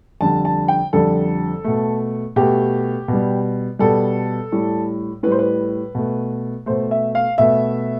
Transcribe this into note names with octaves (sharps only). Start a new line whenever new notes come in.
F2 D3 G3 A5
A5
G5
F2 D3 G3 A4
B2 A3
B2 A3 G4
B2
G3
B2 G3 A4
A2 G3
A2 G3 B4 C5
B4
B2 A3
B2 A3 C5
E5
F5
B2 A3 E5